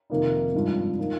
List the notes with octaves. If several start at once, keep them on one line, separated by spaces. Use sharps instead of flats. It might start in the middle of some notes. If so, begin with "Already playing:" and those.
F2 C3 D#3 A#3 D#4
G#1 G2 F3
F3 A#3 D#4